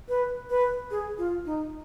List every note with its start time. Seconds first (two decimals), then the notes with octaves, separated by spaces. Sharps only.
0.08 B4
0.50 B4
0.91 G#4
1.18 F4
1.46 D#4